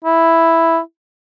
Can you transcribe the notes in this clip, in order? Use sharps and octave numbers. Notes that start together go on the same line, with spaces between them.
E4